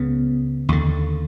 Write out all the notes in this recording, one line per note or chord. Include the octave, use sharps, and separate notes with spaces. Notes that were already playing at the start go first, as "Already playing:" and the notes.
Already playing: C#2 C#3 B3
D#2 D3